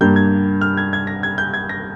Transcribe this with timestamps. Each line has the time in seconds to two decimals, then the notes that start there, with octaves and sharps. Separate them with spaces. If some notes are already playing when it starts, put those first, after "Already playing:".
0.01 G2 G3 A#3 G6
0.16 G#6
0.61 F6
0.77 G#6
0.93 G#6
1.07 A#6
1.23 G#6
1.38 G6
1.54 G#6
1.69 A#6